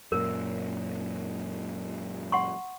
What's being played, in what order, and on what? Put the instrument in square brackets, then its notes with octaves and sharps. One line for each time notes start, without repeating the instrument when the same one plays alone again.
[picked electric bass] F#2 A#2 [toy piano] A#4
[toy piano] F#5 C6 C#6